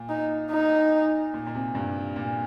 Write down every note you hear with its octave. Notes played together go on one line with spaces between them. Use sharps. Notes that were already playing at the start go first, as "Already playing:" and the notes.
Already playing: A#2
D#4
D#4
A#2
A#2
C3
G2
A#2